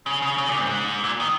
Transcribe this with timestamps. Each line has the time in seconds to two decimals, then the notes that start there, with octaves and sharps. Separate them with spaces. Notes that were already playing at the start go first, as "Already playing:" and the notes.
0.06 C#3
0.22 C#3
0.38 C#3
0.49 A#2
0.60 G#2
1.04 A#2
1.20 D#3